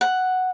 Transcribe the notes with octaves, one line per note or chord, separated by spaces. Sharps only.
F#5